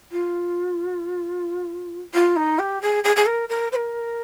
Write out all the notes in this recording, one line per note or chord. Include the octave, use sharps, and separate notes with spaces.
F4
F4
D#4
G4
G#4
G#4
G#4
A#4
A#4
C5
A#4